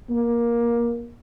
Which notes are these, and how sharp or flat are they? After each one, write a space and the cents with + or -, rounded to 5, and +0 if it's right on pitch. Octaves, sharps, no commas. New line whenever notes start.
A#3 +15